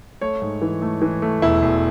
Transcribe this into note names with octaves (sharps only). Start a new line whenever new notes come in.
A3 C#5
G#2
E3
A3
E3
A3
E1 E4
E1